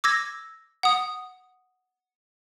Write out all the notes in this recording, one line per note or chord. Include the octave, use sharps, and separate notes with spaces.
D6 E6 G#6 A#6
F#5 D#6